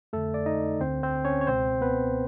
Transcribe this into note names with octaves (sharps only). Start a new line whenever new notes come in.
F2 D3 A3 A4
D5
D#4 D#5
D2 D3 C4 C5
C4 C5
C#4 C#5
C#5
C#2 B2 C4 C5
B3 B4